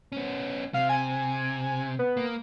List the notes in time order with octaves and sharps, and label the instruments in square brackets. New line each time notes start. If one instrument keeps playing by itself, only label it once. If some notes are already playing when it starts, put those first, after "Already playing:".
[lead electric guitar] B3 C#4
[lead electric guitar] C3 [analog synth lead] F5
[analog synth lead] G#5
B3
[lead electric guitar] A#3